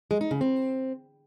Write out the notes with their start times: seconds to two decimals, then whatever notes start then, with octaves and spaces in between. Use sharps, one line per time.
0.11 G#3
0.21 D#4
0.31 C#3
0.41 C4